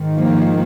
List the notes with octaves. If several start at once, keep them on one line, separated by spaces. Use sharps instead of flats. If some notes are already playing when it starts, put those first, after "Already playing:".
Already playing: G#2 D#3
F3 A#3